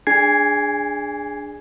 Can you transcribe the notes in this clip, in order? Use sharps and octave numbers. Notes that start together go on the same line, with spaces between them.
D4 G#4 G#5 G#6 C7